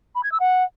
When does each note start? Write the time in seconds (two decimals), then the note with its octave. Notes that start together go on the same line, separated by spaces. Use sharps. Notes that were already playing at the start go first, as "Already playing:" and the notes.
0.15 B5
0.23 G#6
0.32 E6
0.40 F#5